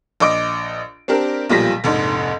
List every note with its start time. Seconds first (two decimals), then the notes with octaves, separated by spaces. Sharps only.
0.20 A#1 D#5 D6 D7
1.08 C4 D4 G4 A#4
1.49 B1 A#2 F3 G3 A#6 B6
1.84 F1 A#1 G#2